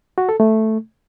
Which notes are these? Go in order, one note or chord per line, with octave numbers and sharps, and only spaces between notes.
F#4
A4
A3